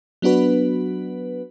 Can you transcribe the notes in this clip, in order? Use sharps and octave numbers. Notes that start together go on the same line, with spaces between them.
F#3 B3 D4 F#4 B4